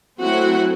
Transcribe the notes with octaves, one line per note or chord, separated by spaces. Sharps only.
F#3 A3 C4 E4 F#4 F#5